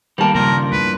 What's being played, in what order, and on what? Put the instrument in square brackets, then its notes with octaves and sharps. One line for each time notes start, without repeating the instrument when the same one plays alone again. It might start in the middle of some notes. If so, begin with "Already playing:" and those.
[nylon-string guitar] D#3 A5 [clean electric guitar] G3 A#3
[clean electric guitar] G2 F3 A#3 [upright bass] C#3 [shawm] A#4
[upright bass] E2 [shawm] B4